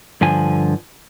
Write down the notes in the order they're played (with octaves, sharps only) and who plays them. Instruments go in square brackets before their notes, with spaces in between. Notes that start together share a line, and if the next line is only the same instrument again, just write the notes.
[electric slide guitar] G2 D3 F3 G#5